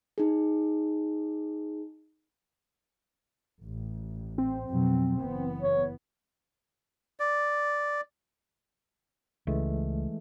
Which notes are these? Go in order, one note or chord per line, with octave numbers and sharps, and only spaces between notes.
D#4 G#4
A1
C4
F2 B2 F#3
F#1 E3 B3
C#5
D5
C#2 E3 G#3 A3